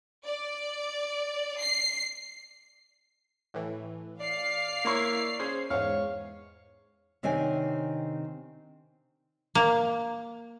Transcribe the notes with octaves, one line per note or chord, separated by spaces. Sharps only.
D5
C7
A2 E3
D5 F5 C7
A#3 E4 C#5
C#4 G#4 C5
E2 G#2 C#5 F5
C3 D#3 C4 D4 C#5 G#5
A#3